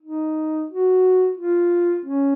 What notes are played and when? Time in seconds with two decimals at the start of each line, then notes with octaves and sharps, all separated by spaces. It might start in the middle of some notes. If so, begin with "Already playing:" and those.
0.02 D#4
0.70 F#4
1.37 F4
2.06 C#4